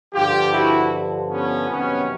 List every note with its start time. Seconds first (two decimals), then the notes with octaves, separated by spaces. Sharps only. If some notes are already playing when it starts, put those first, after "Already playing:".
0.14 G2 D3 F3 F4 G4
0.52 E4 F#4
1.30 B3 C#4
1.68 F2 C3 D#3 F#3 B3 C#4